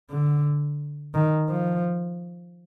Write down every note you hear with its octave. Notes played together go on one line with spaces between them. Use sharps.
D3
D#3
F3